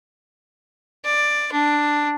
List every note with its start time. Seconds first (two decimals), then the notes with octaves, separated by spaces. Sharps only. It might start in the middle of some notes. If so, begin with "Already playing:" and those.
1.05 D5
1.52 D4